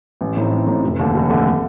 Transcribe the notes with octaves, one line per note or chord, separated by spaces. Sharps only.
A1
A2 A3 C4 D#4
A1
A2 A3 C4 D#4
F1
D#2 D3 A3
F1
D#2 D3 A3